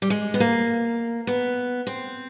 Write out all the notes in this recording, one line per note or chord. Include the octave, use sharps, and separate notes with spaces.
G3
G#3
B3
A#3
B3
C4